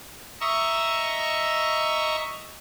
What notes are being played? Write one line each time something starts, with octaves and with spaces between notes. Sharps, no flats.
D#5 E5 A#5 C#6 E6